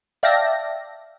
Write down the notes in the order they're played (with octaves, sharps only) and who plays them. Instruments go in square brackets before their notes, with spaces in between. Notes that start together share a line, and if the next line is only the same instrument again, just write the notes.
[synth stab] D5 E5 F5 G5 A5 A#6